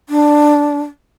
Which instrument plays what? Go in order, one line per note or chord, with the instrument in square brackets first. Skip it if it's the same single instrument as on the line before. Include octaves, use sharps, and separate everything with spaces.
[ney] D4